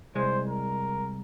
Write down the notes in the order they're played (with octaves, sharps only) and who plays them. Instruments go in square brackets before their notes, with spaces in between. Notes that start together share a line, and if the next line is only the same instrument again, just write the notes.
[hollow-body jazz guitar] C2 G#3 [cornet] C5
[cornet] A#4